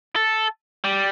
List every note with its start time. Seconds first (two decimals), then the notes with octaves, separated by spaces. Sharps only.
0.16 A4
0.84 G3